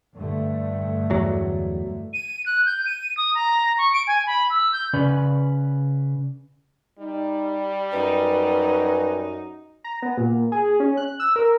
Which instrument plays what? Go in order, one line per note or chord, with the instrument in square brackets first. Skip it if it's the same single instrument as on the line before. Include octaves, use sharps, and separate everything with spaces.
[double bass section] G2 D3 A3
[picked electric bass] E2 F#3
[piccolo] D#7
F#6
G6
D#7
D#6
A#5
C#6
D7
G#5
B5
E6
G6
[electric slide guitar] C#3 C#4 B4 D5
[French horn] G3 [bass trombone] D#4
[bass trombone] F#2 [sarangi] D#4 [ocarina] B4
[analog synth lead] A#5
B3
A#2
G#4
C#4
F#6
E6
A#4